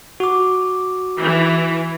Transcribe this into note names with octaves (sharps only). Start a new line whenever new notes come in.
F#4 D6
E3